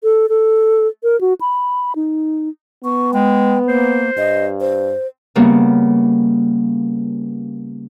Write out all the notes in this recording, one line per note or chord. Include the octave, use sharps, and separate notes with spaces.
A4
A4
A#4
F#4
B5
D#4
B3 C#6
G#3 G5
A#3 C5
G2 D#5
C5
C#3 G3 A#3 B3